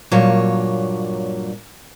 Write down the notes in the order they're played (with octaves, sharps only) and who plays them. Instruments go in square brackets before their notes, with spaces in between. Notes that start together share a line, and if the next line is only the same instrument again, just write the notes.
[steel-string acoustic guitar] G2 A#2 F#3 A#3 C#5